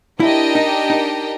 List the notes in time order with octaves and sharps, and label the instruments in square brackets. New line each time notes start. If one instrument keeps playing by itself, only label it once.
[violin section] D4 G4 A#4 D#5 G5 [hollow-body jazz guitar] E4
[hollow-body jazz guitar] D#4
D#4